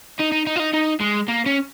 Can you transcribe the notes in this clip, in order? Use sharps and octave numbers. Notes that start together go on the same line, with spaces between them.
D#4
D#4
D#4
F4
D#4
D#4
G#3
A#3
C#4